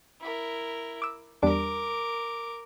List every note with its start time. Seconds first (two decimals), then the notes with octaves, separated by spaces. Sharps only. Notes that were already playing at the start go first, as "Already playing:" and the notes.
0.20 E4 A#4
1.02 D6 E6
1.43 E2 G3 D4 A#4 D6